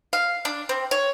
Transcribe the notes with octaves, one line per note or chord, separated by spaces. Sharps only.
F5
D4
C4
C#5